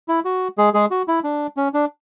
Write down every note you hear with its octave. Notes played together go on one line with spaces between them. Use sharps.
E4
F#4
G#3 G#4
G#3 G#4
F#4
E4
D4
C#4
D4